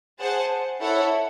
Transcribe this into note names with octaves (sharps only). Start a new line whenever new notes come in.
G#4 C5 F#5 A5
E4 A4 C#5 F#5